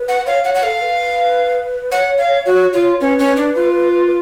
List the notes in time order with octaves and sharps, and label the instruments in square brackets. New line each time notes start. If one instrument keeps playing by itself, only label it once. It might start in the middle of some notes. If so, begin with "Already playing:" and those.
Already playing: [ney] B4
[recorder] F#5
[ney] C#5 [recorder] F5
[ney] C#5 [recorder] F#5
[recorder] F#5
[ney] A4 [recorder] F5
[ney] B4
[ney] C#5 [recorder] F#5
[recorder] F5
F#4
F4
[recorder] C#4 [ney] B4
[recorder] C#4
D4
F4
[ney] B4